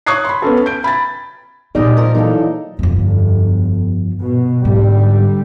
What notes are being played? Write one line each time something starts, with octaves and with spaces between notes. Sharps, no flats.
C#5 C#6 D#6 F#6 G#6 C7
B5 C6
B3 C#4 A4
G6 D7
B5 G#6 A6
A#2 G3 G#3 D#4 G#4 D5 D#5
F3 A#4
E3 F#3 A#3 D#4 A4
G1 F2 F3
B2
G#2 D3 G3